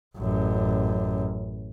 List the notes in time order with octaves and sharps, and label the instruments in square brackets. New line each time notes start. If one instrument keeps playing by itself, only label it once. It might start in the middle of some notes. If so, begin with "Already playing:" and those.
[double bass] A1 F#2